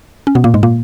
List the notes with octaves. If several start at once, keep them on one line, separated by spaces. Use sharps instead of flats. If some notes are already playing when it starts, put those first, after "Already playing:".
C#4
B2 B3
A#2 A#3
G#2 G#3
A#2 A#3